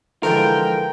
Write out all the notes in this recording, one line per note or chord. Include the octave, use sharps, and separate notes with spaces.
D3 E3 F3 G#3 A#4 G5